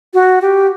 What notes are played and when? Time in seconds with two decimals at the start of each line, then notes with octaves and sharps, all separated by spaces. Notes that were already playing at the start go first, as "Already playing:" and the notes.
0.14 F#4
0.42 G4